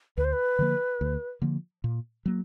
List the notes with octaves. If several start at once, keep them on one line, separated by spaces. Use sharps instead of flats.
D2 B4
C5
B4
D3 F3 A#3
D2
D3 F3 A#3
A#2
F#3 A#3